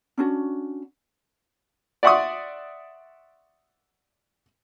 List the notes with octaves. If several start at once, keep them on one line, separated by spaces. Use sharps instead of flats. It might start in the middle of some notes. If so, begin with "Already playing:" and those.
C#4 D4 F#4
D5 E5 F#5 C6 C#6 D#6